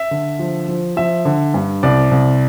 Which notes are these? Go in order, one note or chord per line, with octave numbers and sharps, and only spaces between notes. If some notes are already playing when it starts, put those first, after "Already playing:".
Already playing: E5
D3
F3
F3
F3 E5
D3
G2
C2 D5
C2